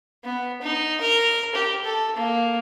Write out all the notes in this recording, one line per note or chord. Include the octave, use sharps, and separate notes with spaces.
B3
D#4
A#4
G4
A4
A#3